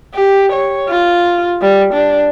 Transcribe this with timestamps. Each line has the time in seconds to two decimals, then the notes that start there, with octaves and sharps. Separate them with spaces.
0.15 G4
0.52 C#5
0.89 F4
1.61 G3
1.93 D4